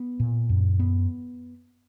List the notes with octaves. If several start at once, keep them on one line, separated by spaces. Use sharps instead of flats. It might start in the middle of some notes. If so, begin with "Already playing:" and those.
Already playing: B3
A#2
F#2
B3